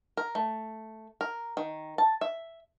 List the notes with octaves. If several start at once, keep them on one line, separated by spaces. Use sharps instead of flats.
A#4
A3
A#4
D#3
A5
E5